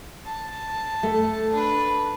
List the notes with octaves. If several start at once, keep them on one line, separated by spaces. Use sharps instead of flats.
A5
A3
D4 B4